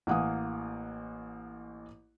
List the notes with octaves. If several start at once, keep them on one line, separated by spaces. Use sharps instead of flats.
A1 A#3 F#5 G#5 D#6